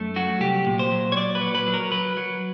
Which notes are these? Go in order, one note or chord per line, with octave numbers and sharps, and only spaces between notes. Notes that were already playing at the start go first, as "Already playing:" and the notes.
Already playing: F#2 A3
F#3 F#4
C2 G4
A#2
C5
F#3
C#5
A#2 D5
B4
F#3
B4
F#3
A#4
F#3 B4
F#3